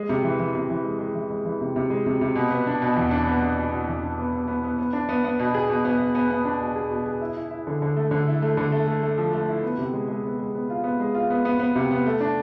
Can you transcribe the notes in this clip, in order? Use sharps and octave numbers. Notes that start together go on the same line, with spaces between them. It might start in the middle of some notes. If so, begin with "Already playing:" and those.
Already playing: G#3
C3
E3
E3
C3
E3
G#3
G#3
E3
G#3
E3
C3
C3
G#3
C3
C3
B2
B3
D4
B2
E2
D4
B3
D4
B2
B2
E2
D4
B3
B3
B3
B3
B3
D4
B3
B3
B2
G#4
B2
B3
B3
B3
B3
D4
B2
G#4
B2
G#4
E4
E4
E4
D3
D3
A3
D3
E4
A3
D3
A3
A3
A3
F3
A3
E4
B3
C3
G#3
G#3
B3
G#3
B3
F4
B3
G#3
F4
B3
B3
B3
C3
B3
A3
D4